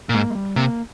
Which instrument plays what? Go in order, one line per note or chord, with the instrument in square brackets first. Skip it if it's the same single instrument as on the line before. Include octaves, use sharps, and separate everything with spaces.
[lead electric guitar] A#2
[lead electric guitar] G#2 [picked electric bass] A#3
[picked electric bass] G#3
G3
[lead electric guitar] C3 [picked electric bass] A#3